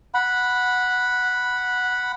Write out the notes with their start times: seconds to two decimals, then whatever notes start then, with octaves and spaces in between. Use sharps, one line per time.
0.14 F#5 B5